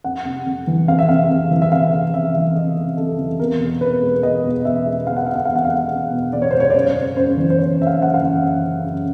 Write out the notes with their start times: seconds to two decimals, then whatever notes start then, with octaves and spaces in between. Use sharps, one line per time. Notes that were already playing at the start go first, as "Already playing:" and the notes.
0.04 F2 F#5
0.25 C3
0.46 F2
0.67 E3
0.88 F2 F5
0.99 E5
1.09 C3 F5
1.30 F2
1.51 E3
1.62 E5
1.72 F2 F5
1.93 C3
2.14 F2 E5
2.35 E3
2.56 F2 D#5
2.77 C3
2.97 F2 A4
3.19 E3
3.39 E2 A#4
3.60 B2
3.81 E2 B4
4.02 G#3
4.23 E2 D#5
4.44 B2
4.65 E2 E5
4.86 G#3
5.07 E2 F5
5.16 F#5
5.27 B2 F5
5.35 F#5
5.45 E2 F5
5.56 F#5
5.65 F5
5.70 G#3
5.91 E2
6.12 B2
6.33 E2 D5
6.42 C#5
6.51 G#3 C5
6.60 C#5
6.70 D5
6.75 F#2 C#5
6.95 C#3
7.16 F#2 C5
7.37 E3
7.50 C5
7.58 F#2 C#5
7.79 C#3 E5
7.87 F5
8.00 F#2 F#5
8.14 F5
8.21 E3
8.42 F#2
8.63 C#3
8.84 F#2